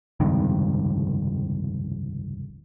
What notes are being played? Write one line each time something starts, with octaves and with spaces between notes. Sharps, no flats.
F1 C#2 G2 D#3